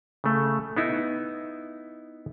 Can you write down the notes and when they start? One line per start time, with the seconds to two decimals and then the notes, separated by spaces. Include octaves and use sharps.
0.24 C#3 A3
0.77 B3 D#4 E4